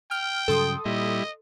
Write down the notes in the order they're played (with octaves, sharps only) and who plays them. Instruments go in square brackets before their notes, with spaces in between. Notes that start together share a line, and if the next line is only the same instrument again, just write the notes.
[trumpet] G5 [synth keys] F6
[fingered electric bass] G2 C#3 F#3 [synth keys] A4 C6 D#6
[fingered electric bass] A#2 [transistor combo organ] G3 E4 [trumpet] D#5